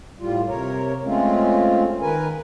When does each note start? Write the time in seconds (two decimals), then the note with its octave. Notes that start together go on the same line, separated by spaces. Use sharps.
0.20 A2 G3 F4
0.48 C3 A#4 C#5
1.04 G#3 A3 C4 C#4 F4
2.01 D#3 A#4 B4 G#5